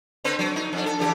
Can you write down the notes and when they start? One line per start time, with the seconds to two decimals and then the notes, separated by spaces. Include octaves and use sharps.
0.24 D3 C4 B4
0.39 F#3
0.56 D#4
0.73 F2 D4
0.86 A4
0.99 C#3 E3 G4